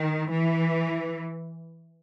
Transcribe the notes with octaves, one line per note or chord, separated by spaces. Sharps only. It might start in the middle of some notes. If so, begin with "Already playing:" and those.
Already playing: D#3
E3